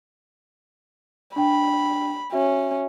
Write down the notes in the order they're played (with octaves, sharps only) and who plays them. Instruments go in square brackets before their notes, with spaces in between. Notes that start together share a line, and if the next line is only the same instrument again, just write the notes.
[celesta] D4 G5 [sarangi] B5
[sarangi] C#4 [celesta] F#4 E5